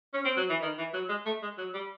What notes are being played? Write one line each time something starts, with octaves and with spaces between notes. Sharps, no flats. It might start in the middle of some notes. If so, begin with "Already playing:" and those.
C#4
C4
F#3
E3
D#3
E3
F#3
G#3
A3
G#3
F#3
G3